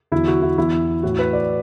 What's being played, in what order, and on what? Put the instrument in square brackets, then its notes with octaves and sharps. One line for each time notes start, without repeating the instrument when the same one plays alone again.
[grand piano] E2 D3 F#3 E4
F#4
E4
E2 E3 E4
A2 E3 F#4
B4
D5